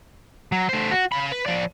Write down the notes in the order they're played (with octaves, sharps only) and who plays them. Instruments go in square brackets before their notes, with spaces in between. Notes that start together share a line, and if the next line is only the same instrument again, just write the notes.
[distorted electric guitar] F#3
A3 C5
F#4
C#3 B5
B4
F3 D5